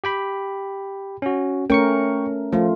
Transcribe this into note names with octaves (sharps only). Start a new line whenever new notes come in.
G4 G5 B5
C#4 F#4
A3 C#4 A#4 G5 C#6 C#7
F3 A3 F4